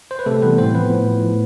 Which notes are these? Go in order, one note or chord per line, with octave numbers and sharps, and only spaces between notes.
C5
B4
C3 A3 A4
E3 G3 B3 B4
A2 C4 C5
F3 B3 B4
A2
F3
A2